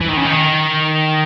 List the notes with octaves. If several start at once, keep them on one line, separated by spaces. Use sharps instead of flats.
E3
D#3
C#3
D#3